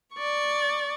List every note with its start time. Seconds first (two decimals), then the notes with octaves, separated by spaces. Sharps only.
0.15 D5 C#6